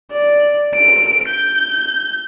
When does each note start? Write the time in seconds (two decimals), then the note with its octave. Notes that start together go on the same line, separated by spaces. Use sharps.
0.12 D5
0.75 D7
1.29 G6